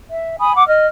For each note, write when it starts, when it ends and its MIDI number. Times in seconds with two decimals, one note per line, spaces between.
0.10 0.35 76
0.40 0.53 80
0.40 0.53 83
0.40 0.53 87
0.56 0.66 78
0.56 0.66 86
0.69 0.87 75
0.69 0.87 89